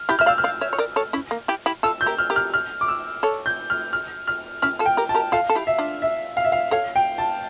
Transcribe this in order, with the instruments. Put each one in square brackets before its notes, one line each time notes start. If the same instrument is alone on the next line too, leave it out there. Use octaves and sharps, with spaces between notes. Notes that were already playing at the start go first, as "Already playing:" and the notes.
Already playing: [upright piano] F6
[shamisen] E4 G4 [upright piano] G6
[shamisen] E5 [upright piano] F6
[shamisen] D5 F5 [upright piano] E6
[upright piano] F6
[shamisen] D5 F5
C#5 E5
C#5
A#4 D5
A4 C#5
C#4 E4
A#3
E4 G4
E4 G4
[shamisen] F4 A4 [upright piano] E6
[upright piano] G6
[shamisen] G4 A#4
[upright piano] F6
[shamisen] G4 A#4
[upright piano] F6
F6
D6
E6
[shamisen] A4 C#5
[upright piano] G6
F6
F6
F6
[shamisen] C#4 E4 [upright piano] F6
[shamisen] F4 A4
[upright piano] G5
[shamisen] G4 A#4
[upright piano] A5
[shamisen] G4 A#4
[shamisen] F4 A4 [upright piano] F5
[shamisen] A4
E4 G4
[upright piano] E5
[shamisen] D4 F4
[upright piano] E5
F5
E5
F5
[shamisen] A4 C#5 [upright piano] F5
[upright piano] G5
A5